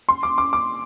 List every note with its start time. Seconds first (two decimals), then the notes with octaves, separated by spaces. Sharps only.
0.09 C6
0.23 D6
0.38 D6
0.53 D6